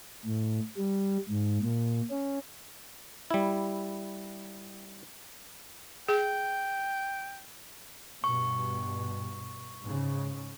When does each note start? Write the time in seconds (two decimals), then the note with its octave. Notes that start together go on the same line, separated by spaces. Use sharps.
0.25 A2
0.77 G3
1.29 G#2
1.63 A#2
2.10 C#4
3.31 G3 E4
6.09 G#4 G5
8.24 G2 B2 C#6
9.83 G#2 C#3